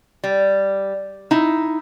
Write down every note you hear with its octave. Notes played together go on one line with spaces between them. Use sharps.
G3
D#4 E4